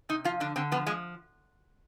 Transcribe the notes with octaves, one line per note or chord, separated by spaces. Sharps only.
C3 D#4
F3 F4
D3 D4
D3 C4
F3 B3
F3 G#3